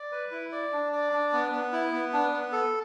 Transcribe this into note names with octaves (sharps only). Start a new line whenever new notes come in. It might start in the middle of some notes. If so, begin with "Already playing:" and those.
Already playing: D5
B4
E4
D5
D4
D5
D4
B3
B3
E4
B3
D4
B3
A4